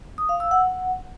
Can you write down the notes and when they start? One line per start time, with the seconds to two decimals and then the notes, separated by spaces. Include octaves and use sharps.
0.18 D#6
0.29 F5
0.40 E6
0.51 F#5